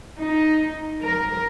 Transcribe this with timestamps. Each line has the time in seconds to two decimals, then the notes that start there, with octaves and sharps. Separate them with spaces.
0.20 D#4
1.03 A#4